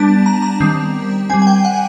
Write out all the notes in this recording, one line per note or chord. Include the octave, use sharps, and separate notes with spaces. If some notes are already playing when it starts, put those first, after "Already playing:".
Already playing: G3 B3 D4 A5
A#5
A#5
D#3 G3 C4
G3 C4 G#5
G#5
G5
F#5